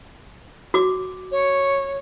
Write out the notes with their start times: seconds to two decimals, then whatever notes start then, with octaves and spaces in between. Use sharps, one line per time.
0.74 F#4 D6
1.32 C#5